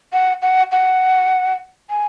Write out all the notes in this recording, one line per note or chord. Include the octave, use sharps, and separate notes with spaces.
F#5
F#5
F#5
G#5